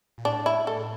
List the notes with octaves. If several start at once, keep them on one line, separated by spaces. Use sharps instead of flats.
A#2
A2 D4
E4
A4